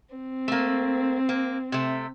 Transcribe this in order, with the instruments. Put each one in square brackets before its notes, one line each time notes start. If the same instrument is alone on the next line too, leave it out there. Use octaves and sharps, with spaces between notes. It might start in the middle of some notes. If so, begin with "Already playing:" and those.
[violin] C4
[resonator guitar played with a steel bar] A3 A#3
A#3
C3 A3